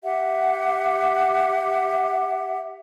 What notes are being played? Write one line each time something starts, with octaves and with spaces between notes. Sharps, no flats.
G4 E5 F#5